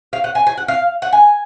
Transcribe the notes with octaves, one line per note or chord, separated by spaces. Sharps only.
F5
F#5
G#5
G#5
F#5
F5
F#5
G#5